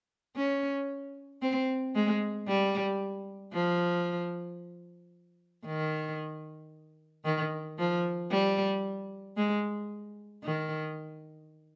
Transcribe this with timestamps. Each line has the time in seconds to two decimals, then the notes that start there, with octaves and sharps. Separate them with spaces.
0.36 C#4
1.42 C4
1.95 G#3
2.47 G3
3.53 F3
5.66 D#3
7.25 D#3
7.79 F3
8.31 G3
9.37 G#3
10.43 D#3